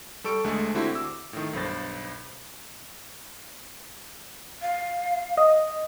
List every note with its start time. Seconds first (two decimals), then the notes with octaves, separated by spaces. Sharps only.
0.24 G3 A4 C#6 D7
0.44 D2 G#3 A3
0.75 D3 C4 E4 F#4 G4
0.95 D6 E6
1.33 A2 D#3
1.53 B1 G2 C5 A6
4.62 F5
5.37 D#5